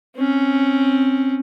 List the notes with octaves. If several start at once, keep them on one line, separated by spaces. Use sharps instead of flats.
C4 C#4